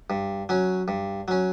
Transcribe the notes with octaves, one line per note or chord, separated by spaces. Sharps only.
G2
F#3 C#4
G2
F#3 C#4